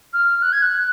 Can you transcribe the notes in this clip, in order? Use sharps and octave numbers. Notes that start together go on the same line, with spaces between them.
F6
F#6
G#6
F#6